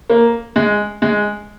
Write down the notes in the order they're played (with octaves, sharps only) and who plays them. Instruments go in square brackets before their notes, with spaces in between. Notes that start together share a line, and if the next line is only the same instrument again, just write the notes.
[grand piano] A#3
G#3
G#3